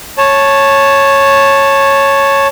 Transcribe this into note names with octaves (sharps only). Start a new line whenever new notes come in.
C#5 A5